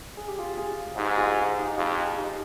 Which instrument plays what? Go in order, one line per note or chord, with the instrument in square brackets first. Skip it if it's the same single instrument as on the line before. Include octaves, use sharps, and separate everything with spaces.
[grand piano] G#4
G4
F4 G#4
F4 G#4
[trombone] G#2 [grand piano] D#4 G4
[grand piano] F4 G#4
F4 G#4
D#4 G4
[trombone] F2 [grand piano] F4 G#4
[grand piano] F4 G#4
D#4 G4